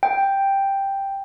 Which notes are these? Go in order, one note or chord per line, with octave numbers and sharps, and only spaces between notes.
G5